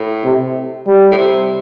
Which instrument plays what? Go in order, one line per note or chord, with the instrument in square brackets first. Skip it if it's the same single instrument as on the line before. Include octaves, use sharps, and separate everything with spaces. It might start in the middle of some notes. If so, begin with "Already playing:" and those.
Already playing: [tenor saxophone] A2
[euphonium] C3
G3
[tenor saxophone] A2
C3